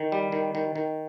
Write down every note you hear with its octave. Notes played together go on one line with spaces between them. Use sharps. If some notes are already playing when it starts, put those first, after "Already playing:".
Already playing: D#3
G3
D#3
D#3
D#3